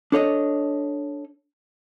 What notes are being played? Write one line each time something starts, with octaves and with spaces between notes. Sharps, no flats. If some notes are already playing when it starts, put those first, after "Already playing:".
D4 A4 C#5 D#5